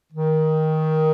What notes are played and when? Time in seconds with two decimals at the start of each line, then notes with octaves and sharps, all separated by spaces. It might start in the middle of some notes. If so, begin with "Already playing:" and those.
0.11 D#3